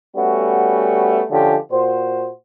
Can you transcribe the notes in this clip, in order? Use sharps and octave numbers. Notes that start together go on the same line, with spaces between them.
G3 A3 B3 C#4 F#4
D3 F3 G#3 C#4 G4
A#2 F#4 C5